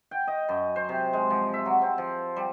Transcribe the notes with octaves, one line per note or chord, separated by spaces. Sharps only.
G5
D#5
F#2
C5
C3
G#3
F3
E5
F#3
C4
F3
G3